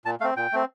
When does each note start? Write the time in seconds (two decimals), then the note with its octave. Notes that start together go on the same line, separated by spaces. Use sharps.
0.05 A#2 A5
0.21 A3 F5
0.24 C4
0.37 A#2 G5
0.53 A3 C4